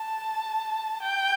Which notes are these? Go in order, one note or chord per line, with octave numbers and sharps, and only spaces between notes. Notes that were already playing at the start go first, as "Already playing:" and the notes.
Already playing: A5
G5